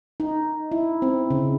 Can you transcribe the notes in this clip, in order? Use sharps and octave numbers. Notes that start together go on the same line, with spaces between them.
D#4
E4
C4
C#3